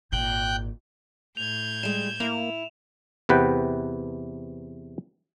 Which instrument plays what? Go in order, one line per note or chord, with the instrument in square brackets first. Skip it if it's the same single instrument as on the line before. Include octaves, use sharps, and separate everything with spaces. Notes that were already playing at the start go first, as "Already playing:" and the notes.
[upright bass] G#1 A#2 [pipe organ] G5 F#6 G6
[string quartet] A2 G6 G#6 [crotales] F7
[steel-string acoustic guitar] G3 G#3 [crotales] E7
[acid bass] A#3 [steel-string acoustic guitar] E4 [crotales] F7
[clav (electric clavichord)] E2 C3 B4 F#5 G5